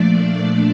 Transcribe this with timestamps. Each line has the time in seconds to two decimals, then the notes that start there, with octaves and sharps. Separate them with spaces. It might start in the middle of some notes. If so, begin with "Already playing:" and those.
Already playing: A#2 F3 A3 D4 D5